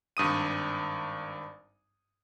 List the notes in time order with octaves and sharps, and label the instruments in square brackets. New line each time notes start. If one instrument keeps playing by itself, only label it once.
[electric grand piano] G#1 G2 D#6 D#7